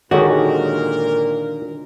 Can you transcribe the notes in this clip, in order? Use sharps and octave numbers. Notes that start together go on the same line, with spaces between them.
A#2 D3 D#3 G#3 F#4 G4 A#4 C#5